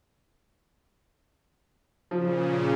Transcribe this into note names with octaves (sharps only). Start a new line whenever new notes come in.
A#2 C#3 F3